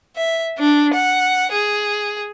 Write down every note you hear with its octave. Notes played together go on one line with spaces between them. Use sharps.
E5
D4
F#5
G#4